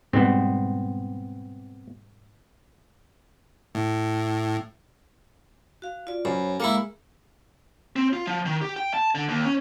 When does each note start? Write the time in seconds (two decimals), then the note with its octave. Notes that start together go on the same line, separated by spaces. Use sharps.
0.13 G#2 B2 G3 B3 C4
3.75 A2
5.82 F#4 F5
6.07 F4 D5
6.25 F#2 C5 C#5 B5
6.60 G#3 A#3 E4 G#4
7.96 C4
8.13 F4
8.27 F3
8.46 D#3
8.61 G4
8.76 G5
8.94 A5
9.15 D3
9.29 D#2
9.45 C#4